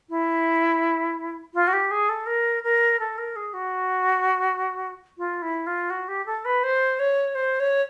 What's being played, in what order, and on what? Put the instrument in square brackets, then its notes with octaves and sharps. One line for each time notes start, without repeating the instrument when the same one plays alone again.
[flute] E4
F4
F#4
G4
G#4
A4
A#4
A#4
A4
A#4
G#4
F#4
F4
E4
F4
F#4
G4
A4
B4
C5
C#5
C5
C#5